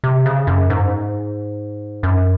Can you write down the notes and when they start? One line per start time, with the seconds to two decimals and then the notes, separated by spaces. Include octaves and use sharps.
0.04 C3
0.26 C#3
0.47 F#2
0.70 G#2
2.03 F#2